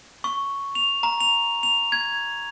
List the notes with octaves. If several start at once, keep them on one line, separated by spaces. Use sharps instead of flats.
C#6
F7
A#5
F7
F7
G#6